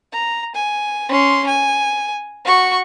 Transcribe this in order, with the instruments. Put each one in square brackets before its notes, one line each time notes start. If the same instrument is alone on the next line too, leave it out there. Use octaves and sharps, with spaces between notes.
[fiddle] A#5
G#5
C#4 C6
G#5
F#4 C#6